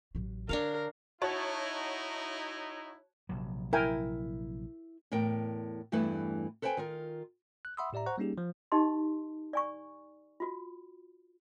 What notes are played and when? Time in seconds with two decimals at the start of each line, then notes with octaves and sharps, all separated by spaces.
0.15 A1 F#3
0.49 D3 D4 A#4 C#5 F5
1.22 D#4 E4 F#4 C#5 A5
3.29 A#1 C3 F#3
3.73 E4 A#4 G5 G#5
5.12 E2 A2 A#4 G5
5.92 E2 G2 E3 A3 E4 B4
6.62 A4 B4 C5 E5 G5 G#5
6.77 D#3 F4 A#4
7.65 F#6
7.77 E5 F#5 B5 C6 D#6 E6
7.93 A2 G4 D5 E5 A#5
8.06 C5 F#5 A#5 C#6 F#6
8.18 G3 A#3 C#4 D#4 G4 G#4
8.38 F3
8.72 D#4 G4 D#5 A5 C6
9.53 D5 G#5 C#6
10.40 F4 F#4